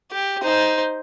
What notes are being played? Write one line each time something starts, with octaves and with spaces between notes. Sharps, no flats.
G4
D#4 C5